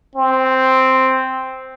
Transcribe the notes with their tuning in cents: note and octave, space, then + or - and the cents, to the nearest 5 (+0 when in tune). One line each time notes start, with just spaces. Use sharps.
C4 +0